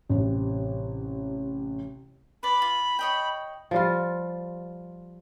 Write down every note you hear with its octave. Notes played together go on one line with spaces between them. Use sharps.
A1 C3
B4 D5 B5
F4
C#5 D#5 G5
F3 G3 F4